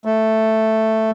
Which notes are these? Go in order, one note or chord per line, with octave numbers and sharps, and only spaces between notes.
A3